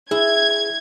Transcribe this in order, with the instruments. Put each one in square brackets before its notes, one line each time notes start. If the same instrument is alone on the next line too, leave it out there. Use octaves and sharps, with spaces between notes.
[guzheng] E4 [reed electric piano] G#4 [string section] G#6